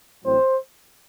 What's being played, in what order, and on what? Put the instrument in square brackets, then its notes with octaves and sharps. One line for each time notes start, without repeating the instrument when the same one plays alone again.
[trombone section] A1 A2 F#3 C4 C5